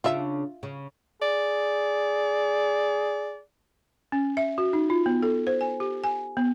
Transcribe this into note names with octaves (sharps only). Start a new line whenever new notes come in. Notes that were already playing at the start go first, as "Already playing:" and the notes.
C#3 D4 F4 E5
C#3
G#4 D5
C#4
E5
F#4
D#4
F4
B3
A4
C5
G#5
G4
G#5
B3